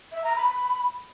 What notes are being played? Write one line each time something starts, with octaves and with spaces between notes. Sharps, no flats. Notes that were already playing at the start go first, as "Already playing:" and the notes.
E5
A#5
B5